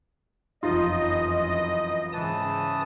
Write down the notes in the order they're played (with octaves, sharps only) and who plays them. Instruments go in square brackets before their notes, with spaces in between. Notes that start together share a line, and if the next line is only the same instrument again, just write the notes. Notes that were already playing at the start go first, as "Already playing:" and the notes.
[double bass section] F1 F#2 E3 [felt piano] F3 D#4 F4 [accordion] D#5
[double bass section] G#2 C#3 [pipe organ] E3 A5 D#6